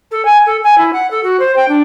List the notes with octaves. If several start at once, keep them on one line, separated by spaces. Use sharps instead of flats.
A4
G#5
A4
G#5
E4
F#5
A4
F#4
C5
G5
D4